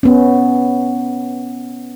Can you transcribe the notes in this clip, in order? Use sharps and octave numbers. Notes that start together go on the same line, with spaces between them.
B3 C#4